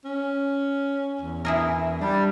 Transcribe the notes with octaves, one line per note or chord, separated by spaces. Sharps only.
C#4
E2
E4 G#4 A#4
G3 D4